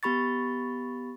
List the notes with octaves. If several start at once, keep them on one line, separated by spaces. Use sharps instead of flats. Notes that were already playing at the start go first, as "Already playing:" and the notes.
B3 G4 B5 C#6 A6